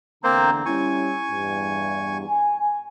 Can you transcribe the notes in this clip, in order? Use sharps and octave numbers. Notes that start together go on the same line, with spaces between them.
E2 D3 A#3 C4 C5 A#5
G3 C#4 E4 G#5 C#6
E2 G2
G#5